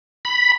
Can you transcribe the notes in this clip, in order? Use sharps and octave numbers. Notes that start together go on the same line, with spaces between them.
B5